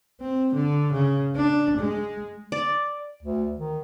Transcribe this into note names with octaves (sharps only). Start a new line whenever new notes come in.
C4
D3
C#3
D4
G#3
D5
D2
D#3